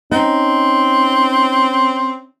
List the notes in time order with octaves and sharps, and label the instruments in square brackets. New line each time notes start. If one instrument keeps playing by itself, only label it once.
[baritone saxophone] C4 [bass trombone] C#4 [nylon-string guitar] D#4